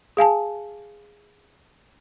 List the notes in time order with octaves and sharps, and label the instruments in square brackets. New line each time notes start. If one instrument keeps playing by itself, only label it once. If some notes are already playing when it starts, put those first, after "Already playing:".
[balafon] G#4 F5 G#5 A5